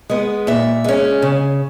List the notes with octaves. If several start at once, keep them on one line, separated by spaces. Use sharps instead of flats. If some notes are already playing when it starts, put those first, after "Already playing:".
G#3 B3
A#2 E5
G#3 C#4
C#3